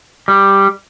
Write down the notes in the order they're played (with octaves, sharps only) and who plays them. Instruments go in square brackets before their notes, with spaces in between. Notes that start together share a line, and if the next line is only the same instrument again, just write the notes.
[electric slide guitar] G3